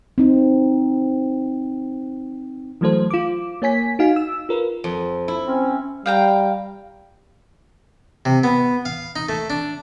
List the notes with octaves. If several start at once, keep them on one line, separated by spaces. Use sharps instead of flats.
C4 D#4
E3 F#3 A3 A4 C5
F4 D6
A#3 C#5 G#5 B6
D#4 F#4 F5 G#5
E6
F4 A#4 B4
F2
E4
C4 C#4
G3 F5 G5 A#5
C3
B3
F5
D#4
A3
D4